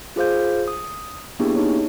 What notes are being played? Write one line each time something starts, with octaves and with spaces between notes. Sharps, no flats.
F4 G#4 C5 F5 G6
D#6
A#3 B3 D4 E4 G4 G#4
D#4 C#5